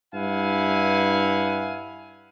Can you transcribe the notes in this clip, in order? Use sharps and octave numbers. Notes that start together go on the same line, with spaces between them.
G2 E4 F5 F#5 G#5